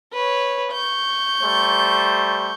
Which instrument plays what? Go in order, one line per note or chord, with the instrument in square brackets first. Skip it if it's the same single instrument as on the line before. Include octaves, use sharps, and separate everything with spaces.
[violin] B4 C#5
C#6 G6
[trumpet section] G3 A3 C5